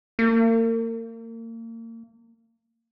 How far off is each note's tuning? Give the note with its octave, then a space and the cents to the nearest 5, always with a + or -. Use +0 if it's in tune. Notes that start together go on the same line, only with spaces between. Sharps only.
A#3 -35